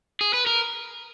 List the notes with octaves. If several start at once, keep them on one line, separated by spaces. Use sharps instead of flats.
G#4
B4
A#4